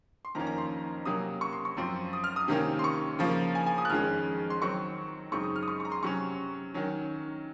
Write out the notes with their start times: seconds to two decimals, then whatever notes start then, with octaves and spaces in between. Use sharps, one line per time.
0.25 C6
0.35 F2 D#3 A#3 C#4 A#5
0.47 A#5
0.58 C6
1.05 C3 F#3 A#3 C#4 D#6
1.41 C#6
1.53 C6
1.65 C#6
1.77 F#2 F3 C4
2.13 D#6
2.24 F6
2.36 D#6
2.48 C3 D#3 A#3 C#4
2.79 C6
2.84 C#6
3.19 C#3 F3 A#3
3.55 G#5
3.66 G#5
3.78 D#6
3.85 F#6
3.89 F2 D#3 G#3 C#4 F6
4.50 C6
4.61 D#3 F#3 C4 C#6
5.32 F#2 C#3 G#3 C4 D#4 C#6
5.44 D#6
5.56 F6
5.63 D#6
5.68 C#6
5.80 A#5 C#6
5.92 C6
6.03 C3 F#3 C#4 C#6
6.74 D#3 F#3 C#4